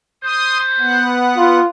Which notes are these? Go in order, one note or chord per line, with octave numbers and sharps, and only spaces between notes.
C5 C6 D#6
B3 F#5
F4